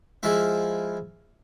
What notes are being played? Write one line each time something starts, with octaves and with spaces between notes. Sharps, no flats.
F3 G#3 E4 E5